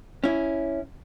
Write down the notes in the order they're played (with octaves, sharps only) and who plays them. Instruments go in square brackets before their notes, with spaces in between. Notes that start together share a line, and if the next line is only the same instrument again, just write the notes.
[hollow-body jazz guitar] C#4 E4